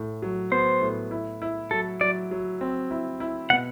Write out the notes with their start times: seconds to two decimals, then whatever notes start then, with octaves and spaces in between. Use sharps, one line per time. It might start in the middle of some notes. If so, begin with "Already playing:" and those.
Already playing: A2
0.22 F#3
0.51 B3 C5
0.81 A2
1.11 E4
1.42 E4
1.71 F#3 A4
2.01 F#3 D5
2.31 F#3
2.61 C4
2.91 E4
3.20 E4
3.50 B2 F#5